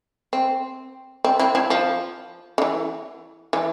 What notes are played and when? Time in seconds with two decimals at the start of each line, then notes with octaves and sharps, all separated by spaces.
0.33 C4
1.24 C4
1.39 C4 E4
1.55 C4 E4
1.70 F3
2.58 D3
2.62 E3
3.53 E3